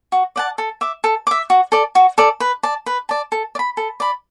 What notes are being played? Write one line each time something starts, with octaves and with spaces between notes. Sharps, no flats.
F#4
D5 F#5 A5
A4
E5 D6
A4
E5 D6
F#4
A4 D5
F#4
A4 D5
B4
D5 A5
B4
D5 A5
A4
D5
B5
A4
D5 B5